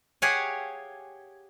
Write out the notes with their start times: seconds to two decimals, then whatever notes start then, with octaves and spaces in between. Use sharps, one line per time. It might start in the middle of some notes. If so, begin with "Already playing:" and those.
0.22 G4 G#4 C#5 F5 F#5 G#5